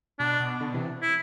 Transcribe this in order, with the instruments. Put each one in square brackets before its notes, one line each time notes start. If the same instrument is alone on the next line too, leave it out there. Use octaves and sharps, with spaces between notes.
[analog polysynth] B2 [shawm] D4
[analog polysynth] B2
B2 D3
C3 E3
[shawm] E4